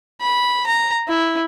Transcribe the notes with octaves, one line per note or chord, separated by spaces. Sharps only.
B5
A#5
E4